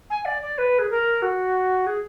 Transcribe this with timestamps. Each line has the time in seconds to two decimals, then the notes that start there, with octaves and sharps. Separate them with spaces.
0.10 G#5
0.25 D5
0.42 D5
0.57 B4
0.78 G#4
0.90 A#4
1.22 F#4
1.86 G#4